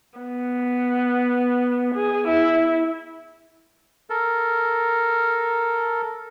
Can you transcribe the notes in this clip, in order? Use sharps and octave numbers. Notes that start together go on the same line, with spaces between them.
B3
G#4
E4
A4 A#4